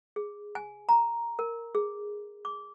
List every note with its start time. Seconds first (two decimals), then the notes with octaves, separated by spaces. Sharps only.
0.16 G#4
0.55 G#5
0.89 A#5
1.39 A#4
1.75 G#4
2.45 D6